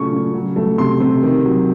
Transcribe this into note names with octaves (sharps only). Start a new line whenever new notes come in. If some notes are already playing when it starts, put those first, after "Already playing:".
Already playing: A#2 C#3 F#3 A3 C#6
C#3
F#3
A3
C3 C6
C3
D#3
F#3